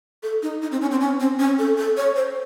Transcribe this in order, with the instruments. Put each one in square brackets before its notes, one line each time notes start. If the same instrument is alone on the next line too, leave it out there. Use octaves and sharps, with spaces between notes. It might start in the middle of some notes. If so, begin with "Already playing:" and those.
[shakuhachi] A4
D#4
D#4
C4
C#4
C4
C#4
C4
C#4
A4
A4
C#5
C5